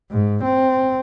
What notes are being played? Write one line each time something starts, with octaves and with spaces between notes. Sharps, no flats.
G#2
C4